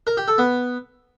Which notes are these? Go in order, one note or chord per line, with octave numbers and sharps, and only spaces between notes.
A#4
G4
A4
B3